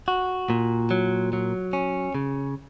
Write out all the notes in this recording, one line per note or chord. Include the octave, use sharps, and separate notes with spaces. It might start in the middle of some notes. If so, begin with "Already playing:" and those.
F#4
A#2
F#3
F#3
C#4
C#3